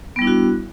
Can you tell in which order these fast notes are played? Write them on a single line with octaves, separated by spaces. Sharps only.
B3 G3 E4 D4 F#4